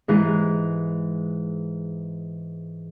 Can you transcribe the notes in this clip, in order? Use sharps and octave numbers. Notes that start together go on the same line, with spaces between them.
G#2 E3 G#3